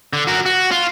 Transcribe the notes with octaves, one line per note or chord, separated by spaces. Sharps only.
D3
F#4 A#4
F#4
F4